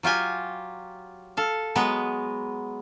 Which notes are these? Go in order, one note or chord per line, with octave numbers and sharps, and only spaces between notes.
F#3 F4 G4 G#5
A4 F5
F#3 G#3 B3 B4